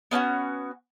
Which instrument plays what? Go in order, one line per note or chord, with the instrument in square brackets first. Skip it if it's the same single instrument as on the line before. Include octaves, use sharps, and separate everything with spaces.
[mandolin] B3 C#4 D4 F#4